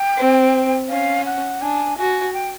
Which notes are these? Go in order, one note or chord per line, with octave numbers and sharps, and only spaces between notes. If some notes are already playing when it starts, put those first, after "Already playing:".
Already playing: G5
C4
C#4 F5
F#5
D4 G#5
F#4 G#5
G5